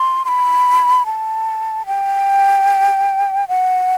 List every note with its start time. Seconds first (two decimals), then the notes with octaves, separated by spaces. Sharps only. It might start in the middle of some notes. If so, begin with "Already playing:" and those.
Already playing: C6
0.25 C6
0.28 B5
1.06 A5
1.86 G5
3.48 F#5